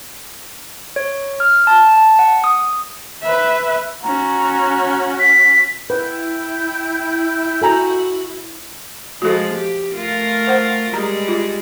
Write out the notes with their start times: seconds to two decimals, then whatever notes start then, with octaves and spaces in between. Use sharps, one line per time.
0.96 C#5
1.40 F6
1.67 A5
1.97 A5
2.19 F#5
2.44 D#6
3.22 B4 E5
4.03 C#4 F#4 A#5
5.20 B6
5.90 E4 B4 G5
7.62 F#4 A4 G#5 A#5
9.22 F3 G#3 F#4 A4
9.55 G4
9.94 A3 F4 A#4
10.47 C5 F#5
10.94 G3 G#3 A#5
11.28 F4